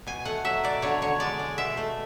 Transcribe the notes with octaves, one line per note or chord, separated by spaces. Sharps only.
B2 G#5
A3 F#5
F#3 E5
B2 D5
D3 C#5
D3 C#5
G#3 D5
G#3
B2 E5
A3